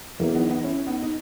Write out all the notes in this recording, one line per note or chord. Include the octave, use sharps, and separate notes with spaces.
E2 F#3 A#3
B3 D#4
B3 D#4
C#4 E4
B3 D#4
D#4